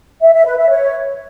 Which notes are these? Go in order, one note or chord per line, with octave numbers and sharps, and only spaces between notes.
E5
E5
B4
E5
C#5